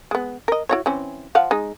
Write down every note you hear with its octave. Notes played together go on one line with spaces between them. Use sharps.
G#3 B3
A#4 D#5
E4 F#4 C#5
E3 C4 C#4
F3 F5 F#5
G#3 D#4